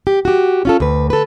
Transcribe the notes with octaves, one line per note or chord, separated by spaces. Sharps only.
G4
F#4 G4
C#4 F4 A4
D2 B4
A4 B4